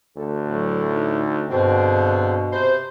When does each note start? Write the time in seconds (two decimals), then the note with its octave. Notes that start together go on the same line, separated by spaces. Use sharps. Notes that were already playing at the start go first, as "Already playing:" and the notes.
0.17 D2 A4
0.48 A2 F#3
0.92 D#4
1.50 G2 B2 D3 G#3 C4
2.52 C3 B4 C5